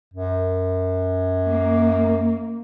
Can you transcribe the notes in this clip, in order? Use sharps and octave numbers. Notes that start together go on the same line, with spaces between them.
F#2
A#3